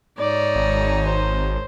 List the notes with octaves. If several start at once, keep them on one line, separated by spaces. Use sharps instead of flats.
G#2 D#4 C#5 D5
G#1
C5